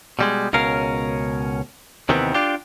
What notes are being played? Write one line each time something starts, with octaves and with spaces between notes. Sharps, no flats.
B2 G3 G#3
C#2 B2 C#4 A#4 F5
D#2 C3 D#3 E3 B3 C4
D4 F4 G4